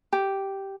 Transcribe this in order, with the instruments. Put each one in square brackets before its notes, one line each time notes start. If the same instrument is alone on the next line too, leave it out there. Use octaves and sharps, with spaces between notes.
[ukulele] G4